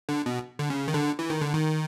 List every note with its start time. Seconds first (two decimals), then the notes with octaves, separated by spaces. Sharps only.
0.09 D3
0.26 B2
0.59 D3
0.70 C#3
0.88 D#3
0.94 D3
1.19 E3
1.30 D#3
1.41 D3
1.54 D#3